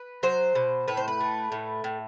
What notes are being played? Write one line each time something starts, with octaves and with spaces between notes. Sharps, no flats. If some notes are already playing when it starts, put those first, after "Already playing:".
Already playing: B4
F#3 C5
B2
A2 B4
C5
B4
A3
A2
A2